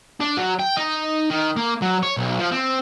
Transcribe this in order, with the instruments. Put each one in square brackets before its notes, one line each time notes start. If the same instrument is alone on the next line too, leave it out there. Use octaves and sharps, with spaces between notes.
[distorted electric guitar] D4
F#3
G5
D#4
D#3
A#3
F#3
C#5
B1
F3
C4